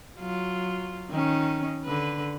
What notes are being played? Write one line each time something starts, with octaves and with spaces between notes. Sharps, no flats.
F#3 F4
D#3 C#4
D3 B4